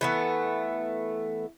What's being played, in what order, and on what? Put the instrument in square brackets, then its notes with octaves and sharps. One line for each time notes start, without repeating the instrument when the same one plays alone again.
[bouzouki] E3 A3 B3